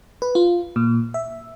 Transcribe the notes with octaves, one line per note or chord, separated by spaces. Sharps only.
B4
F4
A#2
E5